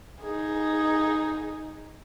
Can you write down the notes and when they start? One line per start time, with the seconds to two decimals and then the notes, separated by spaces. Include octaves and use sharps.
0.22 D#4 G#4